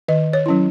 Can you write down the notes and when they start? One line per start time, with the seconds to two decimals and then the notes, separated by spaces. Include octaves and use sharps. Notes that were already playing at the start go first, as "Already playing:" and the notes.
0.08 D#3 D#5
0.33 C#5
0.46 F#3 C#4 E4